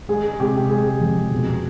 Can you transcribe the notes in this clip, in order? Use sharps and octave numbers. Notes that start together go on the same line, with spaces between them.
G#3 G#4
C3 G4
G#3 G#4
F2
B2